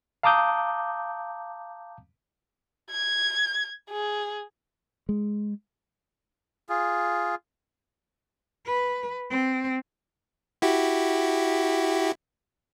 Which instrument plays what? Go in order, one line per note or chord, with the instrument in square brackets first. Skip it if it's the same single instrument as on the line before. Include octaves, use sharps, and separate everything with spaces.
[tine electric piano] F5 A5 A#5 D6 D#6 G6
[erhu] G#6
G#4
[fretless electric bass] G#3
[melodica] F4 G#4
[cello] B4
C4
[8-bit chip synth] E4 F#4 G4